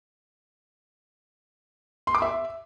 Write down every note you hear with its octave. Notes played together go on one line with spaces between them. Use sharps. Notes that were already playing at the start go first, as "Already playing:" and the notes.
C6
D6
E5